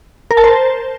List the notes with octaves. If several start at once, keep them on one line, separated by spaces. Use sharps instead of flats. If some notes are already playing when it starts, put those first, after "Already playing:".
A#4
A5
C5